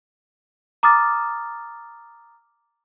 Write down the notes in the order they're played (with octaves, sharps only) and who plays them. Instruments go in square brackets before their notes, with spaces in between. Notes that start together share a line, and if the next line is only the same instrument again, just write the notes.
[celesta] A#5 D6 D#6 F6 A6